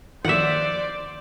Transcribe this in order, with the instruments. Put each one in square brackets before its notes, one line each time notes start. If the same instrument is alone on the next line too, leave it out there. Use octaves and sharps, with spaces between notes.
[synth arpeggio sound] D#3 F3 A#3 [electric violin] C5 D5 [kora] E5 F#5